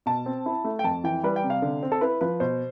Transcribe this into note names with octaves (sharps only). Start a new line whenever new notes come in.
B2 A5
C4
E4
A3
G5
F2 A5
E3 G5
G3 B4
G5
C3
F5
D3
C4
A4
E4 B4
F3 B4
B2 C5